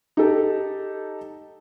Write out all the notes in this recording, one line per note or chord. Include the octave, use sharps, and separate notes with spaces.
D#4 G4 A4